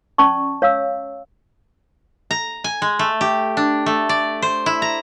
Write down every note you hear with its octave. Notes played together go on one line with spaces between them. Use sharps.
C#4 D5 A5 C#6
C#5 F5 E6
A#5
G#5
G#3
A3
G4
D4
A3
D5
C5
E4
A#5